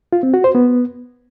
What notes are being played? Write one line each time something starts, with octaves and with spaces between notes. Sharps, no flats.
F4
C4
F#4
C5
B3